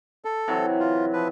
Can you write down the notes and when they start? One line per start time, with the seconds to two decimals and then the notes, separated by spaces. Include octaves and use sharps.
0.25 A4
0.48 C3 E3 F#3
0.80 F4
1.13 F3 B4